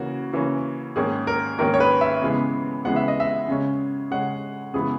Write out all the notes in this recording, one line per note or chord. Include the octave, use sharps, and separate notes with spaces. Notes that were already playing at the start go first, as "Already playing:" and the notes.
Already playing: C#3 E3 A#3 C#4 F#4
C#3 E3 A#3 C#4
G#2 D#3 A#3 C#4 G#4
A#4
G#2 D#3 A#3 C#4 A#4
C#5
B4
E5
C#3 E3 G#3 B3
C#3 E3 G#3 B3 F#5
E5
D#5
E5
C#3 G#3 C#4
C#3 G#3 C#4 F#5
F#2 C#3 E3 G#3 B3 G#4